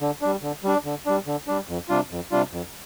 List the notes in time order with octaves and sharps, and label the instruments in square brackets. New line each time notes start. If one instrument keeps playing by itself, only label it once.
[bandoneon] D3
G3 D4
D3
G3 D4
D3
G3 D4
D3
G3 D4
F2
C3 G3 D4 F4
F2
C3 G3 D4 F4
F2